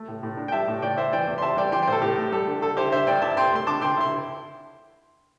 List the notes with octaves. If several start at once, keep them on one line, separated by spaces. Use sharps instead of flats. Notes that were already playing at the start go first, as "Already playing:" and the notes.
Already playing: A3
A2
A2
D4
G5
G3 E5 A5
A2
A2 D5 G5
E4 C5 E5
E3 D5 G5
E2
C6
C4 E5 A5
G3 D5 G5
E3 G5 C6
G5 C6
A2 A4 C5
A2 G4
A3
G3 A4
D3
D3 A4
E4 G4 C5
D3 C5 E5
G2 D5 G5
E4 E5 A5
C4 G5 C6
A3 C6
D3 A5 D6
D3 G5 C6
E4 C6